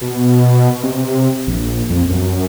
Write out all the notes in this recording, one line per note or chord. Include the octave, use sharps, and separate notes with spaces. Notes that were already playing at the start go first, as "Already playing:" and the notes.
B2
C3
A#1
F2
F#2